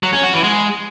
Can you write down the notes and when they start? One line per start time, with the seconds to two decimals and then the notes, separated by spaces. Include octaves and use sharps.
0.03 F#3
0.13 C#4
0.23 F#4
0.34 E3
0.44 G#3